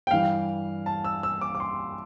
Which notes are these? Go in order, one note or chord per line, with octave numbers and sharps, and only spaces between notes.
G5
G2 E3 F5
A5
E6
E6
D6
D6
C6